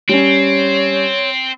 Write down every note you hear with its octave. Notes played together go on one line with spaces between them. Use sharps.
G3 C4 C#4 C#5